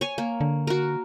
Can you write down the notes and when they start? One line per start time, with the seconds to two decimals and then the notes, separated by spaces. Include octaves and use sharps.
0.01 C#5 G#5
0.18 A#3
0.41 D3
0.67 F#4 A#4